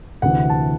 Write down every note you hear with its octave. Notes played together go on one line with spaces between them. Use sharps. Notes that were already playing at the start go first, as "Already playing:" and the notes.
D2 C3 E3 F#5
A5